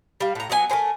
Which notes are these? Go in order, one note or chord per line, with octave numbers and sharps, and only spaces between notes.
G3 F5
A2 A#5
F#3 B3 D4 G#5
A3 A#4 C5 G#5